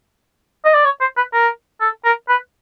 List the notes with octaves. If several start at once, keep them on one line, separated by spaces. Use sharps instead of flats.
D#5
D5
C#5
C5
B4
A#4
A4
A#4
B4